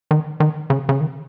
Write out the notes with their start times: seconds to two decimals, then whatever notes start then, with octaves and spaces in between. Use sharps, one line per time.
0.11 D#3
0.40 D#3
0.70 C#3
0.89 C#3
1.01 D#3